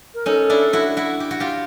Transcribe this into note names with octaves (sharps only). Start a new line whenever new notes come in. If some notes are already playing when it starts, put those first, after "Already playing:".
A#4
C#4 D#4 A4
D4 E4
E4 F#4
E4 F#4
G4
F#4
F4 G4